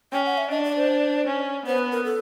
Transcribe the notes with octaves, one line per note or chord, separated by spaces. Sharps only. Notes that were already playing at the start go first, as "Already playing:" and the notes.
C#4 G5
F#5
E5
D4 D#5
D5
C5
C#4
B3 C5
B4
A#4
A4